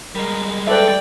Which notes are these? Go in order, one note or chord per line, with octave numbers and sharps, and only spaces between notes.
G3 G#3 A#4
A4 B4 D5 E5 G5